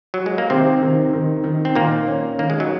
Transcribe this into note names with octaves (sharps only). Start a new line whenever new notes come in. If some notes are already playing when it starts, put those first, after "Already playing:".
F#3
G#3
A#3
C3 D#3 C4
D#3
D#3
D#3
C4
A#2 D#3 A#3
C#4
D#3 A#3
G#3
F#3